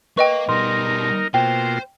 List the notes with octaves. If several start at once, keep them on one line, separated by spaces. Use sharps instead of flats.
A#3 B4 D#5 G5 C#6
B2 G3 D#4 A#4 C6
B2 A#3 F4 C5 G5